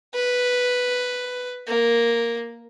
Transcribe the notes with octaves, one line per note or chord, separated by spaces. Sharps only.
B4
A#3